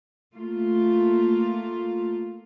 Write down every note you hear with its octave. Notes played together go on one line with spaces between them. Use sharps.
A3 A#3 F4